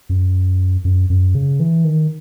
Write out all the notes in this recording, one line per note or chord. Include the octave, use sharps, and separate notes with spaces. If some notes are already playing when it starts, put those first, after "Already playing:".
F#2
F#2
F#2
C#3
E3
D#3